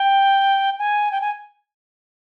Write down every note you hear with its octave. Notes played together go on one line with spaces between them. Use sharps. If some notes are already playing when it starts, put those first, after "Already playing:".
Already playing: G5
G#5
G5
G#5